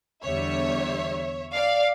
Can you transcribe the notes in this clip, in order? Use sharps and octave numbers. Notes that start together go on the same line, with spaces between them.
E2 D3 G3 C#5 E5
D5 F5